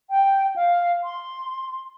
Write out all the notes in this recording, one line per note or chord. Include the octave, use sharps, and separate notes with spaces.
G5
F5
C6